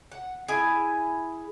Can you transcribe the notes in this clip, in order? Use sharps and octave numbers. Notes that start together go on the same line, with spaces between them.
F#5
E4 G#4 G#5